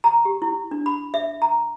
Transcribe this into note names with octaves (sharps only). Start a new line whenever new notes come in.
A#5
G4
E4
D4
B5
E5
A#5